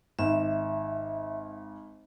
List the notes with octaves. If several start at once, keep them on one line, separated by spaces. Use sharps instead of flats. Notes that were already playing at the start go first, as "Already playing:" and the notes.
G#1 E5